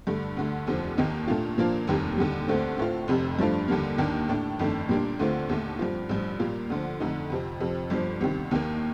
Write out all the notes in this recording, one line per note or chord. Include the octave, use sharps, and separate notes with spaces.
G2 D3 A3
D2 D3 A3
F1 D#2 D3 F3
D#2 D#3 A#3 D#4
A#2 A3 D4 F4
A#2 F3 A#3 D4 F4
F1 D#2 D#3 G3 A#3
D#2 D3 G3
D2 D3 A3 C4
A2 A3 C4 F4
F1 F2 C3
G2 F3 A3 D4 F4
D#2 D3 G3 A#3
D#2 D#3 A#3 D4
A2 A3 D4
G1 F2 D#3 A3 D4
A#2 G3 A#3 D4
D2 D3 A3 C4 F4
D#2 D3 A3
G2 F3 C4 F4
A1 G2 F3
A#2 G3 A#3 F4
D2 D3 F3
F2 D3 A3 D#4
F2 C3 F3 C4
F2 C3 F3 C4
G1 G2 F3
C2 C3 D#3
D#2 D#3 A#3